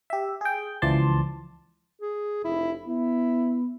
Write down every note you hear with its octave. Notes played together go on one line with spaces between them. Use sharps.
G4 E5
G#4 G5
C#2 E3 F3 D5 A5 C6
G#4
F1 E4
B3 E4